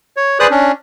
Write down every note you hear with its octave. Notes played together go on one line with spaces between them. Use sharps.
C#5
G#4 B4 C5 D5 D#6 F#6
C#4 D4